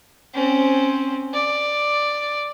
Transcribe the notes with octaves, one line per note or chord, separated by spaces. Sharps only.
C4 C#4
D5